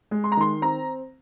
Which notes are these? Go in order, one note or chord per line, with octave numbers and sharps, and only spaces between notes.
G#3
C6
A#5
D#3 C6
C4 A#5